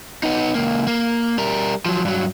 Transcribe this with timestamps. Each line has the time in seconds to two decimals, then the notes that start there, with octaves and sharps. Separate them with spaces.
0.23 B3 D#4
0.55 C#2 A#3
0.87 A#3
1.38 G3 A#4
1.85 F3 F#3
2.05 G2 F#3